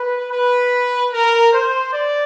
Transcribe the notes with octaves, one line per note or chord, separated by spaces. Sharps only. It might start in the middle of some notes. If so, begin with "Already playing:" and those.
Already playing: B4
B4
A#4
C5
D5